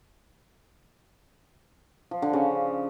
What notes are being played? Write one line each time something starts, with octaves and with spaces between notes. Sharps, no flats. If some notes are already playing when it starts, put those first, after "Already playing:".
F3
D3
C#3